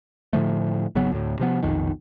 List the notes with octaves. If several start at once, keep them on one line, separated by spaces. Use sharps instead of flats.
A2 D3 F3 A3
G#1 C#3 F#3 B3
D2 A2
C3 F3 B3
F1 B1 F2 D#3